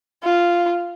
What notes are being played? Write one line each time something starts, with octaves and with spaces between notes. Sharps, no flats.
F4